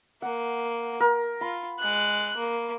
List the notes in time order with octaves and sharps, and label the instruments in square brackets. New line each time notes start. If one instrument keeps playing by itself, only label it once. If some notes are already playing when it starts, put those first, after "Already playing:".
[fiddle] A#3 [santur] F#5
[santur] A#4
[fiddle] F4 [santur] B5
[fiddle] G#3 F#6
A#3